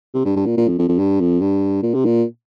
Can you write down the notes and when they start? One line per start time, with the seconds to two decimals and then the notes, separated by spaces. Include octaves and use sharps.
0.14 C3
0.25 G2
0.36 G2
0.46 A#2
0.57 A#2
0.68 F2
0.79 F2
0.89 F2
0.98 G2
1.20 F2
1.41 G2
1.83 A#2
1.94 C3
2.05 A#2